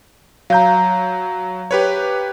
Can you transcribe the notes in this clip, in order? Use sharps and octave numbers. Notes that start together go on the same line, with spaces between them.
F#3 F5 A#5 G6
G4 B4 C#5